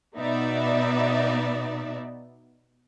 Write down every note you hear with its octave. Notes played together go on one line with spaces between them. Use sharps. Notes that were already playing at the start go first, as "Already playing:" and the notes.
B2 B3 D#4 D5 E5